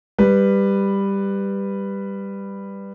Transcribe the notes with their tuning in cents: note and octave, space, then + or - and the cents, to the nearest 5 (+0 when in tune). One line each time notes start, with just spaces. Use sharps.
G3 +10 B4 +0